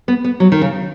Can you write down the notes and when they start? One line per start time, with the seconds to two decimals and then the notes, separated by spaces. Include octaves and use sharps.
0.08 B3
0.24 B3
0.40 F#3
0.52 D#3
0.61 C#3